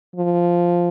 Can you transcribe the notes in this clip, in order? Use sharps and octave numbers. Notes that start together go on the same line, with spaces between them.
F3